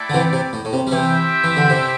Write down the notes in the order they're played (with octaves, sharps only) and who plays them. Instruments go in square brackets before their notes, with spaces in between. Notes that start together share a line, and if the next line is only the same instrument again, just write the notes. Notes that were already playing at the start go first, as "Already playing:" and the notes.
Already playing: [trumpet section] A3 E4 A4 D5 G5
[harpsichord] D3
C3 E3
C3
A2
A2
C3
G3
[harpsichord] C3 E3 [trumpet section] C4 E4 G4 E5 G5
[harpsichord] E3
D3
C3